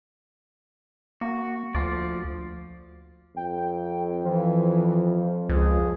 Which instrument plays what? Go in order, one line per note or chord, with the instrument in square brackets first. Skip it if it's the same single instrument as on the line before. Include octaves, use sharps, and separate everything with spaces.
[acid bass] A#3 [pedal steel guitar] F#4
[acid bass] D2 [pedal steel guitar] F3 F4 D5
[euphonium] F2 [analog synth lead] G5
[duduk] E3 [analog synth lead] F3
[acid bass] C#2 [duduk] G#4